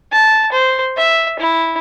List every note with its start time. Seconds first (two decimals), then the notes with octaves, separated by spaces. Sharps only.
0.12 A5
0.52 C5
0.97 E5
1.39 E4